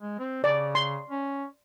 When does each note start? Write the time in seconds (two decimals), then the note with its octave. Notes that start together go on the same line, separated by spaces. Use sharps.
0.01 G#3
0.19 C4
0.44 C#3 D5
0.75 C6
1.10 C#4